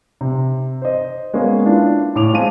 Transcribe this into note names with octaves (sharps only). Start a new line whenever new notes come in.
C3
C5 D#5
G#3 A#3 B3 C#4
D4 E4 F4
A2 D6 F7
G#3 C4 F5 A5 D#7